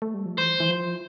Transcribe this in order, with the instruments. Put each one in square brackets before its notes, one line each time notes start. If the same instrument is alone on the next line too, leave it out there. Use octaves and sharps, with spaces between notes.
[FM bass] A3
G3
F3
[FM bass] E3 [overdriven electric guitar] C5
[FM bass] E3
F3